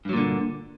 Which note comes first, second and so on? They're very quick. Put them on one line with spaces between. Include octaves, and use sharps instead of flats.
G2 F#3 A#2 D3